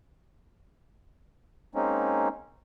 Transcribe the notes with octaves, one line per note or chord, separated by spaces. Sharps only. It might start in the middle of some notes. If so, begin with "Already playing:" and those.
G#3 A#3 C4 C#4 D#4